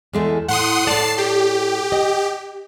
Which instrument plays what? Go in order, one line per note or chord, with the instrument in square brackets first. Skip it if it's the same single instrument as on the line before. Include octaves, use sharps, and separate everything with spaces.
[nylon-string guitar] E2 G#3 A3
[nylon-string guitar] A2 [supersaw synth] F#5 C6 D#6
[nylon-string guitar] A2 D5 [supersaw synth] A5 C7
[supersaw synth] G4
[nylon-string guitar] D#5